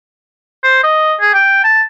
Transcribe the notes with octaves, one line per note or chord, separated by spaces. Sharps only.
C5
D#5
G#4
G5
A5